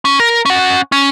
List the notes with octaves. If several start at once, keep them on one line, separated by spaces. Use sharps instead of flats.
C#4
A#4
C#4 F#5
C#4